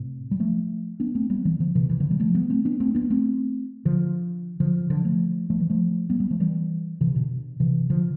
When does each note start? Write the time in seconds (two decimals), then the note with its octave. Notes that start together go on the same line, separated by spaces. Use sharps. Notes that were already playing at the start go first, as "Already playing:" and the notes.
Already playing: A2 C3
0.31 G3
0.40 F3 A3
1.00 B3 D4
1.15 A3 C4
1.30 G3 B3
1.45 E3 G3
1.59 D3 F3
1.75 C3 E3
1.89 C3 E3
2.00 D3 F3
2.11 E3 G3
2.20 F3 A3
2.35 G3 B3
2.50 A3 C4
2.65 B3 D4
2.80 A3 C4
2.95 B3 D4
3.10 A3 C4
3.85 D3 F3
4.60 D3 F3
4.90 D3 F3
5.05 F3 A3
5.50 F3 A3
5.60 E3 G3
5.70 F3 A3
6.10 G3 B3
6.20 G3 B3
6.31 F3 A3
6.40 E3 G3
7.01 C3 E3
7.15 B2 D3
7.60 C3 E3
7.90 D3 F3